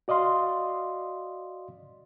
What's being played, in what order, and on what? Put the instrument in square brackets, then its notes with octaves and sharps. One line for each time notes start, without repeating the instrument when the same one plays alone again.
[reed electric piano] F#4 D5 D#5 F5 C6